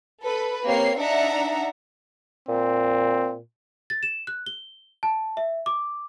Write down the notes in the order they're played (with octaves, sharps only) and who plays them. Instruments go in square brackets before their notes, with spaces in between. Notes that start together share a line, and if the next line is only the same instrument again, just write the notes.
[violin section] A4 B4
A#3 C4 G4 C#5 C7
D4 D#4 E5 F#5 A#5
[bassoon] A#2 [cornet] C4
[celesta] A6
E7
F#6
G7
A5
E5
D6